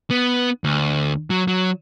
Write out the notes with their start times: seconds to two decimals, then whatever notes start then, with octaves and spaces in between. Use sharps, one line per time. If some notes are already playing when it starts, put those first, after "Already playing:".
0.10 B3
0.64 D2
1.30 F#3
1.48 F#3